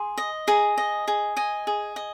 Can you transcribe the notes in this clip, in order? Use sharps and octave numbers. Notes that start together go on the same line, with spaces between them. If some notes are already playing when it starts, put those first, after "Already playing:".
Already playing: G#4 C6
D#5
G#4 A#5
D#5
G#4
D#5 G#5
G#4
D#5